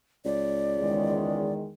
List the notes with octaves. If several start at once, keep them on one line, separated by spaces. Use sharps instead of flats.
C#2 D5
E2 D#3 G#3